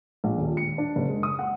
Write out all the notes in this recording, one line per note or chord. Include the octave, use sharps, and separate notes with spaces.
A#1
D#1
C#7
D4
F#1
G#3
D#6
F#5